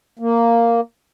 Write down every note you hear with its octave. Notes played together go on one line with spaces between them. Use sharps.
A#3